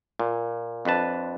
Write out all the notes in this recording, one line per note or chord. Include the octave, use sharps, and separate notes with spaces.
A#2
F2 D4 B4 A5